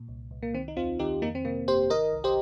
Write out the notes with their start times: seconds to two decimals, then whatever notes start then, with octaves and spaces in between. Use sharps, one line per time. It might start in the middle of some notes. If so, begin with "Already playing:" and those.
Already playing: A#2
0.08 C2
0.31 C2
0.43 A#3
0.54 D#3 C4
0.68 D#4
0.77 D#2 C4 F4
0.99 D#3 D#4 G4
1.22 F2 A#3 D#4
1.35 C4
1.45 C3 A#3
1.68 G1 G4 C5
1.90 D#3 A#4 D#5
2.13 C2
2.24 G4 C5